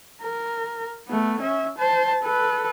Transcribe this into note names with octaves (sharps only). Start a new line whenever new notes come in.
A#4
A3 B3
C#4 E5
C5 A5
A4 B4